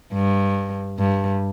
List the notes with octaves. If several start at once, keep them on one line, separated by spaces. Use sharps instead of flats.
G2
G2